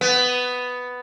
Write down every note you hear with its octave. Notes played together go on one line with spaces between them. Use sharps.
B3